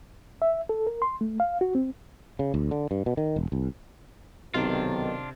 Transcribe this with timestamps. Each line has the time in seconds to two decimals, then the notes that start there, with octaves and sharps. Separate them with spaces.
0.42 E5
0.69 A4
0.87 A#4
1.02 C6
1.21 A3
1.40 F5
1.61 F#4
1.75 C4
2.39 C#3
2.54 D2
2.71 D3
2.91 G2
3.06 B2
3.17 D#3
3.36 E1
3.52 C2
4.54 B1 C3 D#3 D4 F4 D5 A5